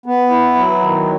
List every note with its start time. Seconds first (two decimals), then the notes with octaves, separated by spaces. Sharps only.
0.06 B3
0.30 E4
0.55 F#3
0.81 D#3